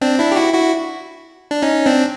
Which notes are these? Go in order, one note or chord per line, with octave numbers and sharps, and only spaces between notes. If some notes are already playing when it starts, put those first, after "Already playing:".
C4 D4
D4 E4
G4
E4 F#4
E4 F#4
D4
C#4 D#4
C4 D4